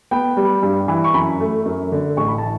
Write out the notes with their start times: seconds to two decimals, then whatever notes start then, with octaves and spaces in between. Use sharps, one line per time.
0.11 B3 G5
0.37 G3
0.63 G2
0.88 E3
1.04 C#6
1.14 F#2 B5
1.40 A3
1.65 F#2
1.92 D3
2.17 A1 C#6
2.28 B5
2.38 E3 A5